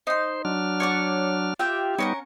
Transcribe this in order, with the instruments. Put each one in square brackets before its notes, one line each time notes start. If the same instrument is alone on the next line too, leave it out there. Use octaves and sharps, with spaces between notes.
[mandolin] D#4 C6 [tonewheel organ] C5
[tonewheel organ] F#3 D4 F6
[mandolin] C#5 D5 F#5
[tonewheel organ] F4 [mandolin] G4 E5 G5
[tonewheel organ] G3 B3 D#4 [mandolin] C#4 A#4 F#5